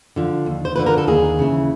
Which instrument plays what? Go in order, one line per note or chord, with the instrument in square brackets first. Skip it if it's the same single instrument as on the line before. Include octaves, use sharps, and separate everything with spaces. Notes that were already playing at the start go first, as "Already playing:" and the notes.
[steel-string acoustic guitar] D3 F3
D#2
C5
D3 F3 B4
A#4
A4
D#2 G#4
C#3 E3